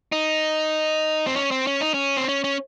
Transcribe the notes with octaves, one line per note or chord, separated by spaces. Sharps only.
D#4
C4
C#4
C4
C#4
D#4
C#4
C4
C#4
C#4